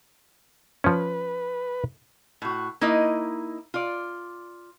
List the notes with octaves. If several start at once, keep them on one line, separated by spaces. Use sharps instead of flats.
F3 C#4 B4
A2 F#4
A#3 D#4 E4 D#5
F4 D5